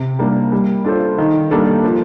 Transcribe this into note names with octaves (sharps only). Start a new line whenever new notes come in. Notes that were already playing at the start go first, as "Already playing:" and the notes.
Already playing: C3
G3 A#3 D4
G3
D4 F4 A4 C5
D#3
G3 A#3 D4 A4
F3